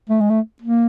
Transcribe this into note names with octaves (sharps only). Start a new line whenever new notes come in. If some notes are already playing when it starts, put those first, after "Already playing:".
A3
G#3
A3
A#3